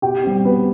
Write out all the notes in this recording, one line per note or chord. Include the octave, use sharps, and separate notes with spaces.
B2 G4 G5
G3 C4
B2 B3 B4